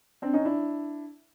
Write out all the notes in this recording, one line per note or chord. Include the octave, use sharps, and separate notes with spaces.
C4 D4
C#4 D#4
D4 E4